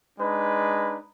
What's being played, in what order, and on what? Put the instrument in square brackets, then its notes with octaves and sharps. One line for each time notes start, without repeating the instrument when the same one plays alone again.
[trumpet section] G#3 D4 D#4 B4